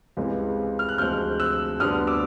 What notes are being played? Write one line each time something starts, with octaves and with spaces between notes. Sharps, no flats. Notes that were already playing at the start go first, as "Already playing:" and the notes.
C#2 C3 E3 G#3
F6
F#6
D2 C3 F3 G#3 F6 G6
E6 F#6
D2 D3 G3 B3 D4 D#6 F6
D6 E6